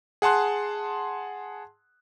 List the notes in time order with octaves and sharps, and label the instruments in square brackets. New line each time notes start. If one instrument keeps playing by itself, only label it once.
[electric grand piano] G#4 F#5 A5 C6 F#6